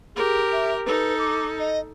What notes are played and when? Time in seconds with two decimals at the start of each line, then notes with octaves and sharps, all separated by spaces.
0.16 G4 G#4 A#4
0.52 E5
0.86 D#4 A4 B4
1.19 D6
1.59 D#5